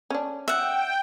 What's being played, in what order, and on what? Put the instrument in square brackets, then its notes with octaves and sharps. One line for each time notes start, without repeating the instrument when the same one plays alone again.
[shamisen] C#4 D4
[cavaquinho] E5 F#5 [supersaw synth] G5